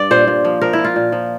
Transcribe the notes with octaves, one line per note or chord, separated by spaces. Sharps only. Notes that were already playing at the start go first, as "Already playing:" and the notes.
Already playing: G2 D5
A#2 C5
A#2
F3
F3 A#4
F3 E4
F4
A#2
F3